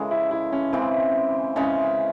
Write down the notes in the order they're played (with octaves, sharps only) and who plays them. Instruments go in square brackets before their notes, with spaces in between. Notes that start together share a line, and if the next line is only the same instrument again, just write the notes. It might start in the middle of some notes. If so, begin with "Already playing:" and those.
Already playing: [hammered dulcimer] C#3 E3 G#3 [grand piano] G#4 A4
[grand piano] E4
E4
C#4
[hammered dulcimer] C#3 E3 G#3 [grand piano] C4
[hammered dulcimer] C#3 E3 G#3 [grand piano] C#4